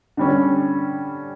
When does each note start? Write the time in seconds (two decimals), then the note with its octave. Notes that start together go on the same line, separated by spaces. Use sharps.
0.17 D3 G3 C#4